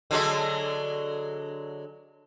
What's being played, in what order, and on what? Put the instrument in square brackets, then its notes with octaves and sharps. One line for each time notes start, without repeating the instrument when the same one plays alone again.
[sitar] D3 F#3 G#3